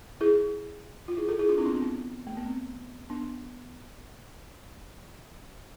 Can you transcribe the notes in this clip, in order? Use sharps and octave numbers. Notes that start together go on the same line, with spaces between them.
E4 G#4
F4
E4 G#4
F4 A4
E4 G#4
D4 F4
C4 E4
B3 D4
C4
B3
A3
B3
C4
B3 D4